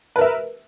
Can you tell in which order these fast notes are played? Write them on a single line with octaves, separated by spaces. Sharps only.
B4 A#4 E5